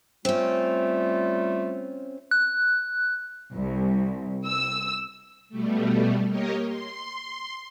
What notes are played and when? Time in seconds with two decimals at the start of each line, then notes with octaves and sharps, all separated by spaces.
0.25 G3 A3 C4 C#4 F4
2.31 F#6
3.54 C2
4.45 E6
5.49 B2 G3 A3
6.29 A#3 G4 A#4 C#5 D#5
6.65 C6